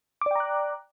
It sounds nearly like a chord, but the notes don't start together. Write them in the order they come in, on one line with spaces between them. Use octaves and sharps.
D6 D5 G5 A#5 F#6